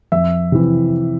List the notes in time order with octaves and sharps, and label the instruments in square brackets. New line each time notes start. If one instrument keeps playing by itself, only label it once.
[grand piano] F2 E5
C3 E3